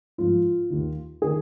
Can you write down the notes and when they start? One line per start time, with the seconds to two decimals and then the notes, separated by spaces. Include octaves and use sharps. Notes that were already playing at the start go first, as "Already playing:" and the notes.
0.18 G#2 F3 F4
0.70 D#2 D#3
1.22 D#3 G#4